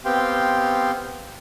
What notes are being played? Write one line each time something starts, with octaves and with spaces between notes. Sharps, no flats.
B3 C4 G4 F5 G5 C6